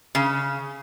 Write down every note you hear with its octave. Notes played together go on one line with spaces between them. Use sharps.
C#3